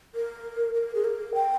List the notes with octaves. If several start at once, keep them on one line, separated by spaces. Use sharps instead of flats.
A#4
A#4
G#4
A#4
G5